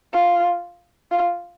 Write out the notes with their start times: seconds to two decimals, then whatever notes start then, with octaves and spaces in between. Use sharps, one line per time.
0.13 F4
1.11 F4